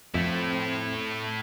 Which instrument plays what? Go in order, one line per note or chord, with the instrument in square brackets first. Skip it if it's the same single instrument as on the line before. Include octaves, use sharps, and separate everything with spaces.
[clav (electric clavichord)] F2 [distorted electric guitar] A3 E4 [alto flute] C4